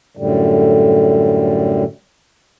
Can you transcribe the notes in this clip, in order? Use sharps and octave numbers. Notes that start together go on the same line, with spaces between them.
F#2 A2 D3 G3